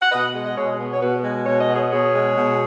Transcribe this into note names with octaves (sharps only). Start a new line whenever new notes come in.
F#5
B2 B4 D#5
G#3
D#5
B2 G#4 C#5
B3
C#5
B2 F#4 B4
G#3
B2 C#5
D#5
B3
G#4 C#5
B2 G#4 C#5
G#3
B2